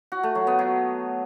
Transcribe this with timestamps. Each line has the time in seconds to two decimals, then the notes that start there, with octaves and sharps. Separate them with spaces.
0.12 F#4
0.23 A3
0.35 F#3
0.47 B3
0.59 F#3